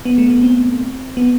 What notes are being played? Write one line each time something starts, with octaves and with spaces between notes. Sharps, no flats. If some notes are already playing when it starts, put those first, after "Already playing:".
B3
A3
B3
C4
B3